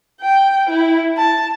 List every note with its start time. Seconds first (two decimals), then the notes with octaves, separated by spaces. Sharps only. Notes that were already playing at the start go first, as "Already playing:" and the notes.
0.21 G5
0.69 E4
1.17 A5